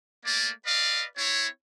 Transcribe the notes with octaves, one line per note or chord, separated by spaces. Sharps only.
A3 A#3 D5
B4 D5 D#5 F5
C4 E4 C#5